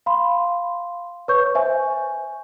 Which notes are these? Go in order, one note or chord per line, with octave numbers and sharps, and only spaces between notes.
F5 B5 C6
B4 C#5 C#6 G6
C5 E5 G#5